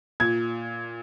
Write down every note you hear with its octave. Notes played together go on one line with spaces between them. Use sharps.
A#2 G#6